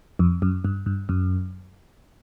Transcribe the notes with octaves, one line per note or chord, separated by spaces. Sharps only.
F2
F#2
G2
G2
F#2